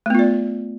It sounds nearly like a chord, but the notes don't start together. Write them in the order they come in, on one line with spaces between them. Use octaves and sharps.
A3 B3 F4 D5